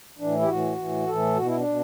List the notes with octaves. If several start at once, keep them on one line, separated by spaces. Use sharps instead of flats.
A2 E3 D4
E4
G4
A2 E3 F#4
A2 E3
A2 E3 A4
B2 F#4
E4
D4
B2